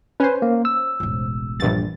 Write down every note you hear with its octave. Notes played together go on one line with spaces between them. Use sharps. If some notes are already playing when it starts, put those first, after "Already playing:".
C#4 B4 C5 G#5
A#3
E6
E1 A1
A#1 E2 G2 A6